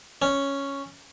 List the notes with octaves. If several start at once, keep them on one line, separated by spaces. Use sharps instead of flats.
C#4